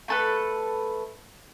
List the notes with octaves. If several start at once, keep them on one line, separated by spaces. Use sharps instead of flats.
A3 A4 B4